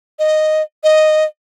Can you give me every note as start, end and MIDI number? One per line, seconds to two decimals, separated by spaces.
0.19 0.62 75
0.84 1.25 75